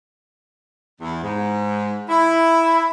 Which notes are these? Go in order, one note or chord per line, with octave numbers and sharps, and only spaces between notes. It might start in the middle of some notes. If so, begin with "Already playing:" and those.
E2
G#2
E4